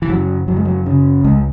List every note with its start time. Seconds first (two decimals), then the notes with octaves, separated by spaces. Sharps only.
0.02 E3
0.09 F#1 F#3
0.48 F#1 F#3
0.57 G#3
0.65 F#3
0.86 C#3
1.24 C#2 G#3